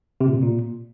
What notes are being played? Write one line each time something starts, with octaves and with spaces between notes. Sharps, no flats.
C3
A#2
C3
A#2